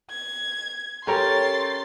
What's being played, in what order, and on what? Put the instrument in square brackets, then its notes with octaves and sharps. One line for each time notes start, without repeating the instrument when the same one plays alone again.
[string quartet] G#6
[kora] C#4 [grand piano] G4 A4 A#4 [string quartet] C6 A6